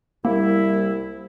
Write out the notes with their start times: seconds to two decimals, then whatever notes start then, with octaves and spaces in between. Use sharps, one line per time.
0.25 C2 G3 A#3 E4